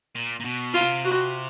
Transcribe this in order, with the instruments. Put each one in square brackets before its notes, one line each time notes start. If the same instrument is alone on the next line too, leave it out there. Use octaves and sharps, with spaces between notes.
[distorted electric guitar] A#2
A#2
B2
[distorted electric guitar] C3 [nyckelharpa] F4
[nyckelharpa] F#4